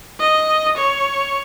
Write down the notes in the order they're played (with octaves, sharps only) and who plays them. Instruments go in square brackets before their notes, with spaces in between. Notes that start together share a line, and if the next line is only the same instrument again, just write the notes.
[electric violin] D#5
C#5